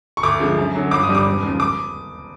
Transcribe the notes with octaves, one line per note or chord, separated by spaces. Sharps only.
C#6
D2 D6
D3 F3 G#3
F#2
D3 F#3
G1 D6
D#6
G2 D3 G3
D6
E1
D#2 C#3 F3
D6